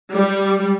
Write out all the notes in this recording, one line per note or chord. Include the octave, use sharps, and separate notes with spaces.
G3